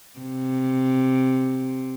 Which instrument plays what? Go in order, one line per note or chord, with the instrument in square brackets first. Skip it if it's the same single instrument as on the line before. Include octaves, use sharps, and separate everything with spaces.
[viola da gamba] C3